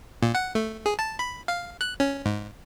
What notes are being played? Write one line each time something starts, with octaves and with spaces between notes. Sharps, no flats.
A#2
F#5
A3
G#4
A5
B5
F5
F#6
C#4
G#2